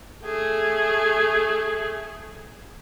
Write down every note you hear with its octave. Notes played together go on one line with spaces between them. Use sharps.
A3 G#4